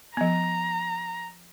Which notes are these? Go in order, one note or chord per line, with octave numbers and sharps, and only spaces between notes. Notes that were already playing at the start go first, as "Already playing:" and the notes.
F3 B3 A#5